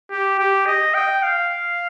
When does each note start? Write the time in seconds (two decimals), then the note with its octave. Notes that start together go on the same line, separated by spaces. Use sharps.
0.10 G4
0.38 G4
0.66 D#5
0.94 G5
1.23 F5